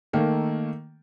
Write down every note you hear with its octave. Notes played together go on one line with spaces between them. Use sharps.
D#3 A3 A#3 A4